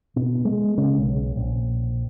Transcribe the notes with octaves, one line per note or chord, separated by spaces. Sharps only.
B2
G#3
C#3
B1
A#1